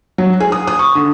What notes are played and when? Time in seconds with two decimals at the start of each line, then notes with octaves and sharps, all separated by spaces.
0.18 F#3
0.40 G#4
0.52 D#6
0.67 D#6
0.79 C#6
0.95 D3